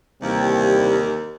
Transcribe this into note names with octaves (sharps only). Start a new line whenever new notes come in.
D#2 C3 E3 G3